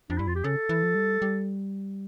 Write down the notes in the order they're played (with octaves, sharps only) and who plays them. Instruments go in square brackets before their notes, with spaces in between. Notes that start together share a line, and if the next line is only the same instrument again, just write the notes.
[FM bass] F2 [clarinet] D4
[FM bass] G2 [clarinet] E4
[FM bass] F2 [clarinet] F4
[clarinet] G4
[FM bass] C#3 [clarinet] A4
[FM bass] E3
F3
G3
G3